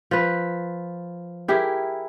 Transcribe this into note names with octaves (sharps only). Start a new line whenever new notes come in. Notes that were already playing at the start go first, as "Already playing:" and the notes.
F3 B4
E4 G4 G#4 A#4